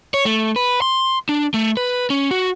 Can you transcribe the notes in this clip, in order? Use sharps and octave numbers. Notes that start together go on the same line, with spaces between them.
C#5
A3
B4
C6
D4
A3
B4
C#4
F#4